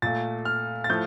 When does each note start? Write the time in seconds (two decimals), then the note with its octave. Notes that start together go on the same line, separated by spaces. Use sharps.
0.02 A#2 A3 A6
0.45 F6
0.84 A6
0.89 A2 F3 A3 G6